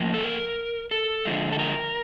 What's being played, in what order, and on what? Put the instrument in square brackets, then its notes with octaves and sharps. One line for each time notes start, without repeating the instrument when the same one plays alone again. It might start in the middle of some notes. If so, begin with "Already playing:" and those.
Already playing: [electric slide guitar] A2 F3 A#3
A4
A#4
A4
D3 F3 G#3
A4
A#4